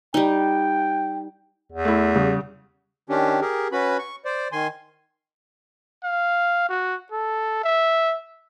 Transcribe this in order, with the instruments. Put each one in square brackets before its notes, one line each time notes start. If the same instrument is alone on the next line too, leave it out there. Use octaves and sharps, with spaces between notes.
[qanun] G3 D#4 [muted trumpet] G5
[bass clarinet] E2
[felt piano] A3 E4
C#3 G3
[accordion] D#3 C#4 D4 G4
G4 G#4 A#4
C#4 F#4 B4 B5
C#6
C5 D5
D#3 G#5 C6
[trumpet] F5
F#4
A4
E5